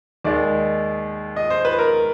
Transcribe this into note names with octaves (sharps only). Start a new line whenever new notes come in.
D#2 D#3 G#3 D5
D#5
C5
B4
A#4